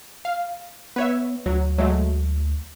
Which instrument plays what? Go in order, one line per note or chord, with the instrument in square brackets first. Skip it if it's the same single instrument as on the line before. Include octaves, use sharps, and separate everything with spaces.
[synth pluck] F5
[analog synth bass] B3 [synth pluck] B4 C#5 E5
[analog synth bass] D2 [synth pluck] F#3
[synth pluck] F#3 G#3 A3